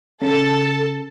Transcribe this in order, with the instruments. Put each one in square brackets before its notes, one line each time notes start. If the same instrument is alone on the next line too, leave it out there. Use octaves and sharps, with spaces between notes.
[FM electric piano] C#3 [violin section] A4 A5